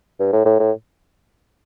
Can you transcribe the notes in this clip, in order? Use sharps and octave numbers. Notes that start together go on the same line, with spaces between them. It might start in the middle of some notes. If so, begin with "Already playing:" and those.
G2
A2
A2
A2